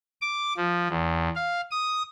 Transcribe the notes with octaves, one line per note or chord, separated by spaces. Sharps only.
D6
F3
E2
F5
D#6